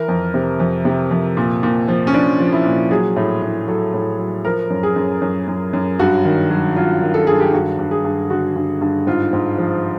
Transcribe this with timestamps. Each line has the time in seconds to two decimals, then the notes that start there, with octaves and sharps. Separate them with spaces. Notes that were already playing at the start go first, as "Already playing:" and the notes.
Already playing: E3 A#4
0.08 F2
0.34 C3
0.60 F2
0.85 C3
1.11 F2
1.37 A#2
1.63 A#2
1.88 F3
2.07 C#4
2.14 F3 D4
2.40 F3
2.53 E4
2.65 A#2
2.91 F#3 G#4
3.16 A2
3.42 A2
3.68 F#3 A4
3.94 A2
4.19 F#3
4.45 F3 A#4
4.70 F#2
4.83 G#4
4.96 F#2
5.22 F#2
5.47 F#2
5.73 F#2
5.99 G2 F#4
6.25 D#3
6.50 F#3
6.76 F#3 F4
7.02 D#3
7.14 A4
7.27 G2 G#4
7.40 G4
7.53 G2 F#4
7.79 G2
7.91 G#4
8.04 G2
8.30 D3 F#4
8.56 G2
8.81 G2
9.07 G#2 F4
9.33 G#2
9.58 F3